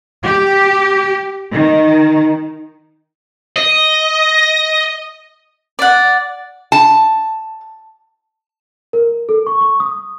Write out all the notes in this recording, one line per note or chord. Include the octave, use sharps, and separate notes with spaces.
G4
D#3
D#5
D5 F#5
A5
A#4
A4
C#6
C#6
D#6